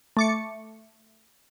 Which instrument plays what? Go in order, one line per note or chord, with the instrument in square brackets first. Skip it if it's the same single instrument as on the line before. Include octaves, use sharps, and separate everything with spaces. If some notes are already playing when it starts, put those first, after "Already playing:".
[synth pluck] A3 D6 C#7